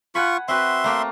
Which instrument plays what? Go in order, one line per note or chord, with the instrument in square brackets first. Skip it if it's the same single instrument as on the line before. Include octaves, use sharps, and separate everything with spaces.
[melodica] F4 C#6 [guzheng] F#5 G#5 B5
[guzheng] C4 F#4 B4 [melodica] E5 C6
[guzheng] A3 A#3 A#4